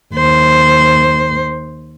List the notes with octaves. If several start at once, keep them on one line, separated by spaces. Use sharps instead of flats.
D#2 C5